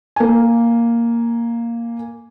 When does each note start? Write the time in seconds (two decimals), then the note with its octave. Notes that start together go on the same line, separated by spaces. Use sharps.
0.16 A#3 G#5